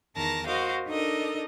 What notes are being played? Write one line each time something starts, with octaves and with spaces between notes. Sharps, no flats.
E2 D#3 A#4 A5 A#5 A#6
F#4 A#4 C5 D#5 F5
D4 D#4 A4 A#4 D#5